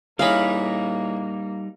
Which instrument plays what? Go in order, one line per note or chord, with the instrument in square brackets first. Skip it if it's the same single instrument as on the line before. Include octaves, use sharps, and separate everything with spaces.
[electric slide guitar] G3 D#4 [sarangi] A#3 [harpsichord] E4 G#4 C#5 [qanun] F5 B5